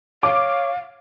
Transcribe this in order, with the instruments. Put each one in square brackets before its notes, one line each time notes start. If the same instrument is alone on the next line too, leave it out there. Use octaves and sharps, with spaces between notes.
[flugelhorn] C#5 [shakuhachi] F5 [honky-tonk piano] D6